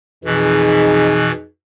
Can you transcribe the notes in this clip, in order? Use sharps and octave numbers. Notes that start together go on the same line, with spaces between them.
F2 B2 E3 D#4 G#4